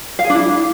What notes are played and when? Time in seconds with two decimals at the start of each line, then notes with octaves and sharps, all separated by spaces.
0.19 F5
0.24 G#4
0.30 D4
0.35 E4